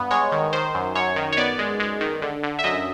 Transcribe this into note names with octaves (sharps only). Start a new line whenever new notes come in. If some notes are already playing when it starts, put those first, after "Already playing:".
Already playing: G2 B3
G#3 C#5
D#3
D#3 C5
F#2
F#2 C#5
D#3
C#5
B3 D5
G#3
G#3
D#3
D3
D3
E5
F#2 D#5